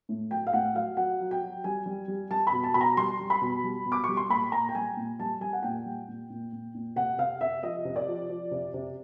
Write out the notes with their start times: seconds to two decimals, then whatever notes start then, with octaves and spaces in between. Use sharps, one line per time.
0.09 A2
0.31 F#3 G5
0.47 F5
0.53 A2 F#5
0.75 F#3 F5
0.97 F#3 F#5
1.20 F#3
1.31 G5
1.42 F#3
1.64 G3 G#5
1.86 G3
2.08 G3
2.31 G3 A5
2.47 B5
2.52 B2
2.64 A5
2.74 B2 B5
2.81 A#5
2.97 G3 C6
3.20 G3
3.30 B5
3.42 B2
3.64 G3
3.86 B2
3.92 D6
4.04 G3 C#6
4.17 C6
4.30 A#2 B5
4.52 A#2 A#5
4.69 G5
4.75 G3 G#5
4.97 A#2
5.20 G3 A5
5.41 G3 G#5
5.53 F#5
5.63 A#2 G5
5.85 G3
6.08 A#2
6.30 A#2
6.53 A#2
6.75 A#2
6.96 C3 F#5
7.18 C3 F5
7.41 C3 E5
7.63 F3 D#5
7.85 C3
7.96 D5
8.08 F3
8.29 F3
8.51 C3
8.74 C3